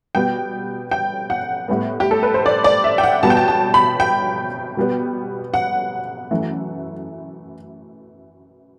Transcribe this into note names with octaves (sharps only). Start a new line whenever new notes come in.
B2 G3 B3 G5
G5
F#5
A2 G3 B3
G4
A4
B4
C5
D5
D5
E5
G5
F#5
B2 G3 B3 A5
G5
A5
A5
B5
G5
B2 G3 B3
F#5
F#2 E3 A3